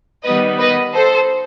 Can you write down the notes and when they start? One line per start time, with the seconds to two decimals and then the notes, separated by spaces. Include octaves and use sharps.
0.25 D#3 G3 B3 B4 D#5
0.60 B4 D#5
0.95 A4 C5